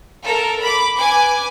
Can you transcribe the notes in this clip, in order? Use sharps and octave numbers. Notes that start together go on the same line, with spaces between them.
A4 A#4
B5 D6
B4 G#5 D6